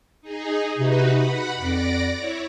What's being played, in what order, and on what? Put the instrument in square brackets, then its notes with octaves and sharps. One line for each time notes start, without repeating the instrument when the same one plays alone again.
[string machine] D#4 G#4
[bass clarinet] C3 [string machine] D#4 F#4 B4
[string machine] F#5 B5
[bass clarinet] F2 [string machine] D5 D6 A#6
[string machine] E4 C#5